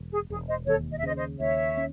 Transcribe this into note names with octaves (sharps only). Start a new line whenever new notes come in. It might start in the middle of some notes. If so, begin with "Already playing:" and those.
Already playing: E1
G#4
E1 G#4
C5 D#5
D#2 A4 C#5
D#5
E5
C#3 C5 D#5
C5 D#5
D#2 C#5 E5
C#4